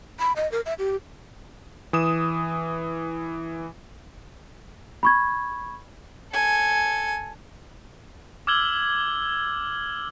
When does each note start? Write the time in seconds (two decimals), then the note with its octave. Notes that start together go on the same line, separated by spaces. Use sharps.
0.20 B5
0.36 D#5
0.52 A#4
0.66 E5
0.79 G4
1.93 E3 D#6 E7
5.03 B5 C#6 G#6
6.32 A4 G#5
8.47 D6 E6 F6 G#6 F#7 G7